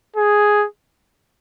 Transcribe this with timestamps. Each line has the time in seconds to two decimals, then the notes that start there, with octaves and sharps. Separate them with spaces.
0.16 G#4